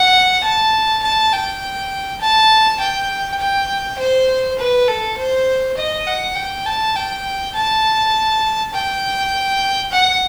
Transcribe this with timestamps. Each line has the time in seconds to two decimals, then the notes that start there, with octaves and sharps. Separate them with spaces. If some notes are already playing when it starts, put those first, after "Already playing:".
Already playing: F#5
0.44 A5
1.03 A5
1.32 G5
2.21 A5
2.80 G5
3.40 G5
3.99 C5
4.58 B4
4.88 A4
5.17 C5
5.77 D#5
6.07 F#5
6.36 G5
6.66 A5
6.96 G5
7.55 A5
8.73 G5
9.92 F#5